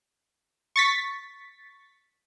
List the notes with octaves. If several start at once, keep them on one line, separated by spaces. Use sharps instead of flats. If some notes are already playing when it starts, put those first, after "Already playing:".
C#6 A6 B6